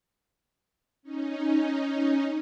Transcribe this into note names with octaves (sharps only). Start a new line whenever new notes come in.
C#4 D#4